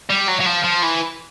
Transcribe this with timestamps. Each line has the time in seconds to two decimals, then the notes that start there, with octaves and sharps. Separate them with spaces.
0.10 G3
0.28 F#3
0.41 F#3
0.46 F3
0.64 F3
0.83 E3